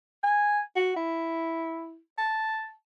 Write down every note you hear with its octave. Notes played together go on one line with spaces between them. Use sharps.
G#5
F#4
E4
A5